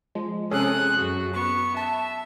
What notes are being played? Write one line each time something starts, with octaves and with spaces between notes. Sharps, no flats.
F3 G#3
C3 C#4 G#4 A4 D#6 F#6
F#2 F#4
B3 C#6
E5 A5